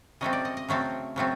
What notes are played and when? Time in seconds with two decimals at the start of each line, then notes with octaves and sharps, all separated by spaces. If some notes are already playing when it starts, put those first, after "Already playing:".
0.21 C#3 F#3 A3 C4 D#5
0.33 D5
0.45 D#5
0.57 D#5
0.68 C#3 F#3 A3 C4
1.16 C#3 F#3 A3 C4